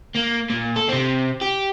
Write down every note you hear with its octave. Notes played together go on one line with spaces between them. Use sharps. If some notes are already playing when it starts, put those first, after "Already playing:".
A#3
A#2
A4
C3 C4
G4